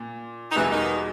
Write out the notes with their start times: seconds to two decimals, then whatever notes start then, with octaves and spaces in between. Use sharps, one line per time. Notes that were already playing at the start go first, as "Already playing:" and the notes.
Already playing: A#2
0.51 D#4
0.55 E2 B2 E3 G3 B3 E4
0.70 D#3 D#4